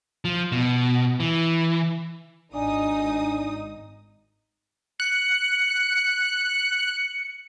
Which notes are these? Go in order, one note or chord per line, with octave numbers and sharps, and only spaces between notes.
F3
B2
E3
G#1 D4 D#4 D5 G#5 D#6
F#6 C#7